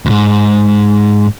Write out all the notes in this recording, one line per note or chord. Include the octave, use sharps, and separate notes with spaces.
D2 G#2